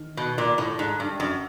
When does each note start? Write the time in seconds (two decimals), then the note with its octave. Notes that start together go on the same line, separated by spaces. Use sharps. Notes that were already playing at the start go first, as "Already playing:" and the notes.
Already playing: D#3
0.17 B2
0.38 A#2
0.58 A2
0.79 G#2
1.00 G2
1.20 F#2